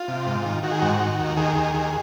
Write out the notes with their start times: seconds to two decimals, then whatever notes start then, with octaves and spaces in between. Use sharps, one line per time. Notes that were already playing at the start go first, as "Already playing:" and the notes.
Already playing: F4
0.08 C3
0.27 G#2
0.45 D#3
0.63 D#3 F#4
0.72 G#4
0.79 G#2 F#4
1.00 D#3
1.19 D#2
1.37 D#3 G#4
1.56 D#2
1.74 D#3